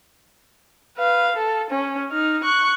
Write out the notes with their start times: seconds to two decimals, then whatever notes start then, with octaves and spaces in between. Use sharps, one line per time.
0.97 B4 F5
1.36 A4
1.70 C#4
2.12 D#4 F6
2.44 C#6 F#6